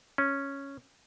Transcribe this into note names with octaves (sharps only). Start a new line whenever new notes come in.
C#4